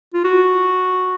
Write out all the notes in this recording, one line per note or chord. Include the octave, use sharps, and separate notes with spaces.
F4
F#4